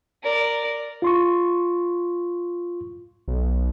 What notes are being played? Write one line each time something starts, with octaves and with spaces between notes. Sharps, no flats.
A#4 D5
F4 C6 C#6
B1